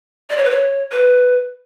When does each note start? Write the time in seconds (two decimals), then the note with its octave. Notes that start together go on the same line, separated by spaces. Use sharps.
0.30 D5
0.37 C#5
0.44 B4
0.51 C#5
0.91 B4